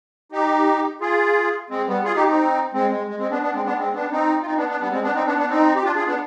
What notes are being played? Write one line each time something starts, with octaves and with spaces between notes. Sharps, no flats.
D#4 G4
F4 G#4
G#3 C4
G3 B3
F4 G#4
D#4 G4
C4 D#4
G#3 C4
G#3
G#3
G#3 C4
B3 D4
B3 D4
G#3 C4
B3 D4
G#3 C4
B3 D4
C4 D#4
F4
C4 D#4
B3 D4
B3 D4
G3 B3
G#3 C4
B3 D4
C4 D#4
B3 D4
B3 D4
C4 D#4
G4
D4 F4
F4 G#4
B3 D4